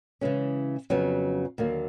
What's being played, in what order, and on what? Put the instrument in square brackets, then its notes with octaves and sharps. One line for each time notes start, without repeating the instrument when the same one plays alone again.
[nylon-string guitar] C#3 E3 G#3 C#4
F2 C#3 F#3 B3
D#2 D3 F#3 A#3